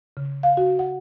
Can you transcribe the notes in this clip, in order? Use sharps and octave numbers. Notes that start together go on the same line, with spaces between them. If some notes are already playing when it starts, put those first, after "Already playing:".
C#3
F5
F#4
F#5